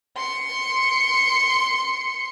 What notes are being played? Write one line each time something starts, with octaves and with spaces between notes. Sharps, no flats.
C6 C#7